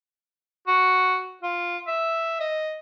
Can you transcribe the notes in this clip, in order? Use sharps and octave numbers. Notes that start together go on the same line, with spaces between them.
F#4
F4
E5
D#5